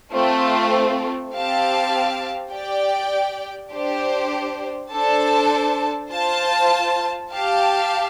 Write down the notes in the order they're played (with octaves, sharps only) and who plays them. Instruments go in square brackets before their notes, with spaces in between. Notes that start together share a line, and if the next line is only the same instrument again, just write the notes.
[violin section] A3 C4 F4
C4 G4 F5 A5
G4 D5 G5
D4 G4 C5
D4 A4 C5 A5
F4 C5 A5
G4 F5 A5